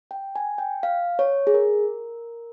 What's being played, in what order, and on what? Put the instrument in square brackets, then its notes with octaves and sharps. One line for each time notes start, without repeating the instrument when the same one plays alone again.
[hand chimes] G5
G#5
G5
F5
C#5
G#4
A#4